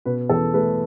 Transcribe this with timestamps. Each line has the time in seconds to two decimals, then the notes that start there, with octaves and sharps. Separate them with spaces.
0.05 B2 B4
0.29 E2 A4
0.53 A3 B4